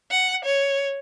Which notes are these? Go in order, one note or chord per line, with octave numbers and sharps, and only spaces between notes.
F#5
C#5